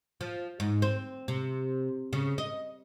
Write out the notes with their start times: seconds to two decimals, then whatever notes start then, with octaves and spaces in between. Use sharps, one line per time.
0.21 F3
0.60 G#2
0.82 C4
1.28 C3
2.13 C#3
2.38 D#5